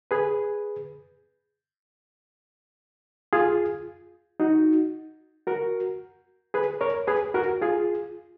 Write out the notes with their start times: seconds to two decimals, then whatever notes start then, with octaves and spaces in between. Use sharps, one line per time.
0.11 G#4 B4
3.33 F4 G#4
4.40 D#4 F#4
5.47 F#4 A#4
6.54 G#4 B4
6.81 A#4 C#5
7.07 G#4 B4
7.34 F#4 A#4
7.61 F4 G#4